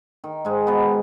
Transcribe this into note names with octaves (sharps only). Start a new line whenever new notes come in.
D#3
G#2 G#3
B2 B3